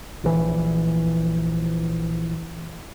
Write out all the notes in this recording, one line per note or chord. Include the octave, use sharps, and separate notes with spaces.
A#1 E3